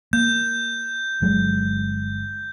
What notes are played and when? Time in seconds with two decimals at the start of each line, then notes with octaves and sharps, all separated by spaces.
0.13 A#3 G6
1.22 G1 F#3 G#3